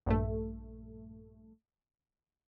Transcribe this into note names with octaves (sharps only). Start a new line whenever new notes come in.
A#1 G2 A3